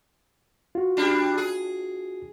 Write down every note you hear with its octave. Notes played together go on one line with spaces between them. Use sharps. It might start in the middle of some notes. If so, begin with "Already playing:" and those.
F4 F#4
G3 D4
G#4